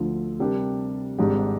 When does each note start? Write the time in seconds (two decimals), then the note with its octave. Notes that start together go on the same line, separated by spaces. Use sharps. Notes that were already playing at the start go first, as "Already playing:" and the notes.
Already playing: D2 D3 F3
0.39 C3 G3 D4 G4 A#4
1.18 G#1 G#2 G3 D4 G4